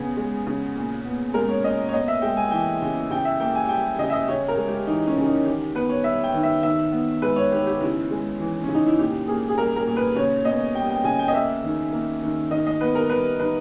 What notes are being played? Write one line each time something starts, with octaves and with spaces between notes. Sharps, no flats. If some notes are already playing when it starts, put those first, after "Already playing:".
Already playing: C#3 B3 G#4
G#3
C#3
A#2
B3
G#3 A#4
C#5
A#2 D#5
C#5
B3 D#5
E5
G#3 G5
G#5
E3 G5
C#3
C#3 G5
E5
A#3 G5
G#5
G3 G5
C#3 D#5
E5
D#5
C#3 C#5
A#4
G#3
G4
E3 D#4
C#4
C#3
D#4
D#3 G4
B3 B4
C#5
G3 E5
G5
D#3
E5
D#3 E5
B3
G#3 B4
C#5
D#3 G4
G4
C#3 E4
G#3
E3
C#4
C#3
D#4
E4
A#2 G4
A#3 G#4
G#4
G3 A#4
A#4
A#2
B4
C#3 C#5
B3 D#5
G3 G5
G5
C#3 G#5
G5
D#5
A#3 E5
D#3
A#3
D#3
D#3 D#5
D#5
B3 B4
A#4
G3 B4
D#3 B4